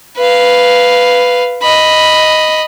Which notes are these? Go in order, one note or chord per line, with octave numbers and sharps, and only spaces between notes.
B4 F5
D#5 B5